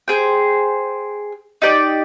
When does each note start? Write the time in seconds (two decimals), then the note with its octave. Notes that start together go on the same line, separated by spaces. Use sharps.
0.08 G#4 C5 G5
1.62 D#4 G4 D5 G5